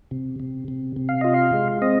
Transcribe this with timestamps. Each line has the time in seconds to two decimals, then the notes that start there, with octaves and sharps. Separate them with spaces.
0.11 C3
0.40 C3
0.68 C3
0.96 C3
1.09 F5
1.21 F4 D#5
1.34 F5
1.53 G#3
1.82 C4 D#5